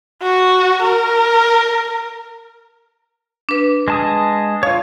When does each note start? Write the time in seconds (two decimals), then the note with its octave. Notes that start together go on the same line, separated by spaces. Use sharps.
0.23 F#4
0.82 A#4
3.49 D4 B4
3.88 G#3 A5 D#6
4.63 F4 C#5 F5